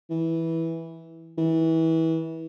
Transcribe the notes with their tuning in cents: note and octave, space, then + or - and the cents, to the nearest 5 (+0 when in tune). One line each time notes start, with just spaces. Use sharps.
E3 -10
E3 -25